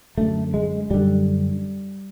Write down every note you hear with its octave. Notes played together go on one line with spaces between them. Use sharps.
F#2 D3 A3
G#3
F#2 D3 G3